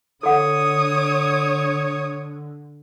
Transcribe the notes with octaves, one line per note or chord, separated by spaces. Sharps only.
D3 A4 C#5 F#5 D#6